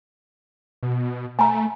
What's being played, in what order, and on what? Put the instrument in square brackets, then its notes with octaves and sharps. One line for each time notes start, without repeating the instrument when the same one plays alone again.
[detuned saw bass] B2
[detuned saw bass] A3 [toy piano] G#5 A#5